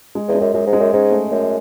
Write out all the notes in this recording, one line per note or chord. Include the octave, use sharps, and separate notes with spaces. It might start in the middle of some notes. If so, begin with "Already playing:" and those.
G#3
E2
G#3
F#2
F#2 G#3
G#2
G#3
F#2
G#2 C#4
A3
F#2 A3